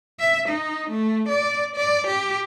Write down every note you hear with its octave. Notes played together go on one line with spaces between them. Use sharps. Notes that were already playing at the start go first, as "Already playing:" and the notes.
E5
D#4
A3
D5
D5
G4